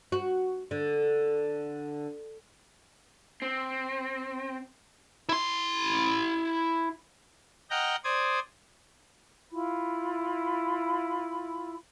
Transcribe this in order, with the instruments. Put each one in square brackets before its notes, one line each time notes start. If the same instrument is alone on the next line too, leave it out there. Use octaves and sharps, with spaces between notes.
[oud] F#4
D3
[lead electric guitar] C4
E4 C6
[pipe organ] D#5 F#5 G5 A#5 F6 G6
C5 D5 D#6 G#6
[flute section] E4 F4 B5